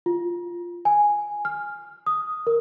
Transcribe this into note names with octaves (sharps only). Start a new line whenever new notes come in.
F4
G#5
F6
D#6
A#4